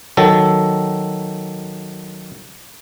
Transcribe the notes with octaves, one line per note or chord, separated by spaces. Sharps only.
D#3 F#3 A4